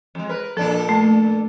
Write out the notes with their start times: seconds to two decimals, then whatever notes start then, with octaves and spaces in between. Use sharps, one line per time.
0.15 F2 G#3
0.29 A#4 B4
0.57 A#2 F3 D4 A4
0.89 A3